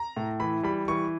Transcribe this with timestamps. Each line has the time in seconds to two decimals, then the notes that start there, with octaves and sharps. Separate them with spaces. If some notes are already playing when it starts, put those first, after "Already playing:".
Already playing: A#5
0.17 A2
0.40 E3 B5
0.63 G3 B5
0.88 E3 C#6